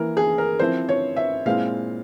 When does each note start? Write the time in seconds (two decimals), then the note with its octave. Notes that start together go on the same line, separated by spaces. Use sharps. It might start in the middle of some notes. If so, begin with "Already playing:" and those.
Already playing: E3 A#3 E4 A#4
0.17 G#4
0.38 A#4
0.59 F3 C4 E4 C5
0.89 C#5
1.16 E5
1.45 A#2 G#3 C4 E4 F5